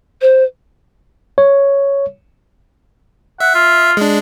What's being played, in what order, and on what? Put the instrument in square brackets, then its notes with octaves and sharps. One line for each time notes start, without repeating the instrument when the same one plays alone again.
[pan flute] C5
[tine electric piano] C#5
[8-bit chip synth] E5 [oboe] F#5
[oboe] F4
[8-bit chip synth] G#3 D4